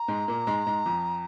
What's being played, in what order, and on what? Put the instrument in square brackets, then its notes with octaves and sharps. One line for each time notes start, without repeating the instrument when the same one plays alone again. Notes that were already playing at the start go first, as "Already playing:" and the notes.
Already playing: [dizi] A#5
[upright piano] G#2 G#3
A#2 A#3
G#2 G#3
G#2 G#3
F2 F3